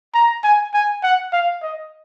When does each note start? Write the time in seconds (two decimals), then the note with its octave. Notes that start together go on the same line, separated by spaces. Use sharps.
0.14 A#5
0.44 G#5
0.74 G#5
1.03 F#5
1.33 F5
1.63 D#5